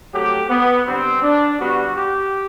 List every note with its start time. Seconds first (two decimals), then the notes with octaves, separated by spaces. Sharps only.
0.14 C3 F#3 A3 G4
0.50 B3
0.86 D3 G3 B3 C4
1.22 D4
1.59 D3 G3 B3 F#4
1.95 G4